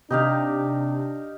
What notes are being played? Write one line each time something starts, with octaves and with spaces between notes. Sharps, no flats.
C3 D4 D#4 G4 F5